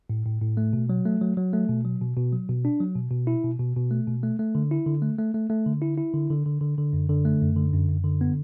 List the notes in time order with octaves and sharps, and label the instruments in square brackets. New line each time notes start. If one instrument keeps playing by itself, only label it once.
[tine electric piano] A2
A2
A2
A3
B2
F#3
A3
F#3
F#3
A3
B2
F#3
B2
B2
F#3
B2
D4
F#3
B2
B2
E4
B2
B2
B2
A3
B2
A3
A3
D3
E4
D3
A3
A3
A3
A3
D3
E4
E4
D3
D3
D3
D3
D3
F#2
D3
A3
F#2
D3
F#2
F#2
D3
B3